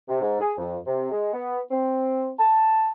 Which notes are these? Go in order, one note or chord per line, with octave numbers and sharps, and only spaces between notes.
C3
G#2
G#4
F2
C3
G#3
B3
C4
A5